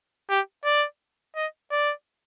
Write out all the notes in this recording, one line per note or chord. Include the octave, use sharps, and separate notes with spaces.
G4
D5
D#5
D5